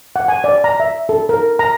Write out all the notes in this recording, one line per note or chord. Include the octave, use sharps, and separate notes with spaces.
F#5
G#5
D5
A#5
E5
A4
A#4
A#5